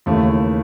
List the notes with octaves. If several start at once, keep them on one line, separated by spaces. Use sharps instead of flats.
D#2 C#3 E3 A3